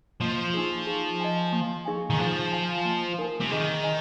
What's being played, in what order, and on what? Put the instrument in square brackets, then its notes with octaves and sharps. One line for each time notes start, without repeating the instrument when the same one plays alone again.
[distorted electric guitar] F3 [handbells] A#3
[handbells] D#4 G#4
G#4
D#5 G#5
A#3
D#4 G#4 F5 G#5
[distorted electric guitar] D#3
[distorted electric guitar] F3 [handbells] G#4
[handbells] F5 G#5
A#3
D#4 A#4 G#5
[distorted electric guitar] C3
[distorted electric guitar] D#3 [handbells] G#4
[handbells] D#5 G#5